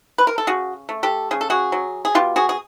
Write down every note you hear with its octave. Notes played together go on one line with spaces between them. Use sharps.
B4
A#4
A4
C#3 F#4 G#4
A3
G4 A4
C#3 G#4
A4
F#4 G#4
F#3
G#4
B2 F4 G4
F#4 G#4
G#4